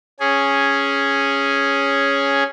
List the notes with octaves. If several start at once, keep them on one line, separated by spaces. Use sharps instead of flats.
C#4 G#4